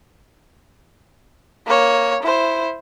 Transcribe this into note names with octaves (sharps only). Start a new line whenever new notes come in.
A#3 C#5
E4 C5